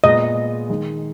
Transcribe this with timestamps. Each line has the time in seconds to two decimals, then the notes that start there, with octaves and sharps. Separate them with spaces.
0.04 A#2 G#3 B3 D#5
0.69 D#3 G#3 D#4